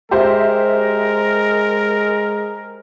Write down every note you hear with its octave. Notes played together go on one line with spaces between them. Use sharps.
G#3 G4 A#4 C5 E5